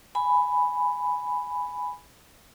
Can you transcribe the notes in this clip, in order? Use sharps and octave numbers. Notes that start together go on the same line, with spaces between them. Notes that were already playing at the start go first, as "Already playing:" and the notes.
G#5 B5